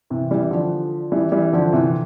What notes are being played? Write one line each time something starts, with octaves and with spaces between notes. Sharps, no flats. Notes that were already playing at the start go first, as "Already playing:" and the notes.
C3 E3
E3 G3
D3 F3
E3 G3
E3 G3
D3 F3
C3 E3